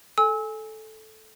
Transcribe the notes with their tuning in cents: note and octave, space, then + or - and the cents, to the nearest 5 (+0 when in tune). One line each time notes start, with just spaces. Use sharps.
A4 -10 G#5 -5 E6 -30